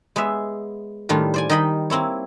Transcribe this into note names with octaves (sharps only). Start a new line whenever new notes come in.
G#3 B3 C#5 E5
A2 D#3 G3 D4 F4
C5 D5 G#5
D#3 G3 D#4 D#5 G5 B5
A#3 C4 E4 C#5